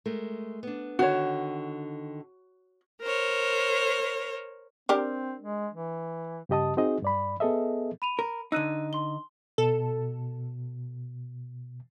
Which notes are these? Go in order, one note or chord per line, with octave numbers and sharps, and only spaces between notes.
G#3 A3 A#4
B3 D4
D3 D#3 F#4 C#5
A#4 C5 C#5
C4 D4 G4 A#4
G#3
E3
G2 C#3 G4 D#5 A5 D#6
C4 D#4 F#4 G#4 D#5
G2 D5 B5
B3 G#4 A4 D#5 E5
B5 D#7 F7
A#4
D3 D#4 E6 F#6 D#7
C6 G7
B2 A4